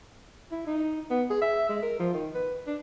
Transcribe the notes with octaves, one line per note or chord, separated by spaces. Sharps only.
E4
D#4
B3
G#4
E5
G#3
A#4
F3
D#3
B4
D4